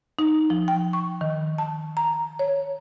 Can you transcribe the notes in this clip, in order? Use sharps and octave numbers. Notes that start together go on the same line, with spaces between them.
D#4
F3
G5
C#6
D#3
A5
A#5
C#5